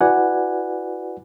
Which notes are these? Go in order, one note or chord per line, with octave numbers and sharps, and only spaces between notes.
E4 F#4 B4 D5 F#5 G#5